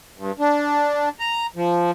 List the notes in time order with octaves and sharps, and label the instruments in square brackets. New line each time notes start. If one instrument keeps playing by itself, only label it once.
[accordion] G2
D4
A#5
F3